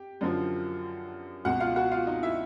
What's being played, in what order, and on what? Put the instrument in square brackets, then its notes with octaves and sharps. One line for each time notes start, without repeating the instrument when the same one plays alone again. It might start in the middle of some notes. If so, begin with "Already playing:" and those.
Already playing: [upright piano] G4
F#2 D3 F3
C#2 B2 G#3 F#4 F#5
F4 F5
F#4 F#5
F4 F5
D#4 D#5
E4 E5